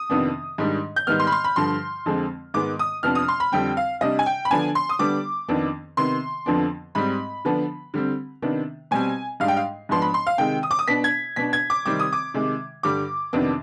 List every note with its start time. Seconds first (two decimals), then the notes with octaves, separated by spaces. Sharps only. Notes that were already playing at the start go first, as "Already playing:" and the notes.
Already playing: D#6
0.10 F2 C3 D#3 B3 D4
0.58 G#2 D#3 G3 D4
0.96 G6
1.07 G#2 D#3 G3 B3 F6
1.20 C6
1.27 B5
1.32 C6
1.44 B5
1.56 G2 D3 F3 C6
2.06 F2 D3 F3 G#3 C4
2.54 G#2 D#3 G#3 B3 D6
2.79 D#6
3.03 F2 C3 F3 B3 D4 F6
3.15 D#6
3.28 C6
3.40 B5
3.52 F2 D3 G3 C4 G5
3.77 F5
4.01 C3 G3 D4 D#5
4.19 G#5
4.26 G5
4.45 B5
4.51 D3 F3 B3 D4 G#5
4.75 C6
4.89 D#6
4.99 D3 G3 B3 D4 D6
5.49 F2 D#3 B3 D4
5.97 C3 D#3 B3 C6
6.46 F2 D3 F3 B3 D4
6.95 G#2 G3 C4 B5
7.45 D3 F3 B3 D4
7.94 D3 G3 C4
8.42 C3 D#3 B3 D4
8.91 B2 G3 C4 G#5
9.40 G#2 G3 D4 F5
9.48 G5
9.57 F5
9.89 G#2 F3 B3 D4 C6
10.02 B5
10.14 C6
10.27 F5
10.38 C3 D#3 G#3 G5
10.63 D#6
10.71 D6
10.79 D#6
10.88 B2 B3 D4 B6
11.04 G#6
11.36 B2 B3 D4 B6
11.53 G#6
11.70 D6
11.86 C3 D#3 G3 C4 D6
11.99 D#6
12.13 D6
12.34 C3 D#3 G#3
12.83 G2 D3 G3 D6
13.33 F2 C3 D#3 B3 D4